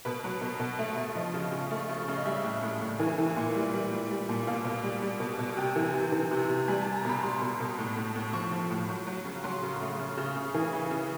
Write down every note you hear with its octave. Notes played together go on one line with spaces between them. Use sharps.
B2 B4
F#3
B2
B2
A3
B2
F3 D#5
C#3
C#3
A3
C#3
C#3
D#5
G3 E5
A2
A2
A2
E3
E3
A#2
G3
G3
G3
G3
A#2
B2 F5
B2
G3
G3
B2
B2
C3 G5
E3
C3
E3
C3
C3
G3 G#5
G3 A5
A#5
B2 B5
G3 C6
B2
B2
A2
A2
A2
F3 C#6
F3
A2
F#3
F#3
C#3
F#3 C6
C#3
A3
C#3
C#3
C#3
E3
C#3
C#3